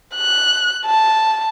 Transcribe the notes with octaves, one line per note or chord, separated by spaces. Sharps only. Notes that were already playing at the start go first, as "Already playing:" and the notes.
F#6
A5